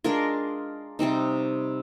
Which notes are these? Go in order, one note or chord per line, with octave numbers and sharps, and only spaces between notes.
G#3 D4 F4 A#4
C3 G3 C4 D#4